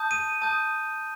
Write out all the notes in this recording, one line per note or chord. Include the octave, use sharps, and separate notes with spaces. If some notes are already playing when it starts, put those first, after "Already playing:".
Already playing: A5 D#6 G6
D#7
A5 D#6 G6